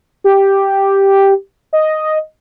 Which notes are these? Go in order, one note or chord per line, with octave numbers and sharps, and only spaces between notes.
G4
D#5